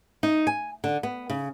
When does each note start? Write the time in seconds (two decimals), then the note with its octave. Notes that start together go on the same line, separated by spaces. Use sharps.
0.23 D#4
0.47 G#5
0.84 D3
1.03 B3
1.30 C#3